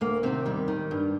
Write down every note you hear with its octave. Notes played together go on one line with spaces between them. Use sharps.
D2 A#3
C3 D#3 C4
D#2 G3
D#3
G2